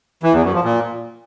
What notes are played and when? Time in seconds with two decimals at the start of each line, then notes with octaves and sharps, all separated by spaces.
0.23 E3
0.33 E2
0.44 F#2
0.54 F3
0.64 A#2